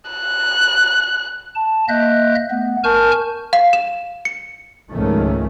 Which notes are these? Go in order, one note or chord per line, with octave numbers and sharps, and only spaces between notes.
F#6
A5
A#3 D#5 E5 F#6 G6
A3 B3
A#4 G#5 A5 C#6 F6 G6
F5
E7
C#7
C#2 G#2 D#3 F3 A3 C#4